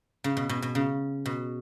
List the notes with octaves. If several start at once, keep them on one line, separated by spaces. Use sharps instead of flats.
C#3
B2
B2
B2
C#3
B2